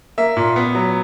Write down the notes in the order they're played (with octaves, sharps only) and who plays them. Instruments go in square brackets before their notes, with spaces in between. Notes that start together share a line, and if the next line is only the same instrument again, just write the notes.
[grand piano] A#3 E5
A#2
B3
F#3